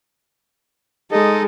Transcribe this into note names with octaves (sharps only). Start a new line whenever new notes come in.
G#3 D#4 A4 D#5